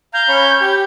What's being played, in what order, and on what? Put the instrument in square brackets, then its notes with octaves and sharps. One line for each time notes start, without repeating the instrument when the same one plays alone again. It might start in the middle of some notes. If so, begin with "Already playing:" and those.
[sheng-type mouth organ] F5 A#5 [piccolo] G6
[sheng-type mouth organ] C#4 C#5 B5
G4